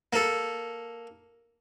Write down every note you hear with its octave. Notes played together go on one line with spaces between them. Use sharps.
A#3 A4